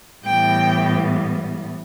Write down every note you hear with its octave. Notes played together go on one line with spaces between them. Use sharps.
A2 E3 G3 B3 G5